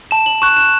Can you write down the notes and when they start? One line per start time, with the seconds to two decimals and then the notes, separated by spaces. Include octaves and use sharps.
0.11 A5 E7
0.26 F#7
0.42 C#6 F#6 E7
0.56 E7